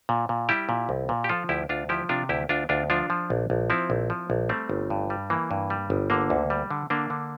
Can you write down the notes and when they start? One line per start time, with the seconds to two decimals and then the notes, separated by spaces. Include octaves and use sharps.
0.09 A#2
0.29 A#2
0.49 G3 E4 G4
0.69 A#2
0.89 C2
1.09 A#2
1.24 G4
1.29 F3 F4 A4
1.49 D2 E4 G4
1.69 D2 D4 F4
1.89 F3 E4 G4
2.09 C3 D4 F4
2.29 D2 E4 G4
2.49 D2 D4 F4
2.69 D2 D4 F4
2.90 F3 D4 F4
3.10 F3
3.30 A#1
3.50 A#1
3.70 F3 C4 E4
3.90 A#1
4.10 F3
4.30 A#1
4.49 G3 A3 C4
4.69 G1
4.90 G2
5.10 G3
5.30 E3 A#3
5.51 G2
5.70 G3
5.90 G1
6.10 D3 A#3
6.30 D2
6.50 G3
6.70 D3
6.90 D3 A#3 D4
7.10 D3